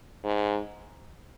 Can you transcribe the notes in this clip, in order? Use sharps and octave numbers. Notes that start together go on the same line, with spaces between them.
G#2